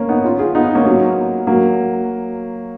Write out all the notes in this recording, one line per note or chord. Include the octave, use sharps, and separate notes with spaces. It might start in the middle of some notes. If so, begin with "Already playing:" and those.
Already playing: A#3 C#4
B3 D#4
C#4 F4
F4 G#4
B3 D#4
A#3 C#4
F#3 A#3
F#3 A#3